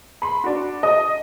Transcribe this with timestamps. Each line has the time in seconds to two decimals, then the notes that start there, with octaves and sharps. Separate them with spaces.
0.22 B5 C6
0.44 D4 F#4
0.83 D#5 D#6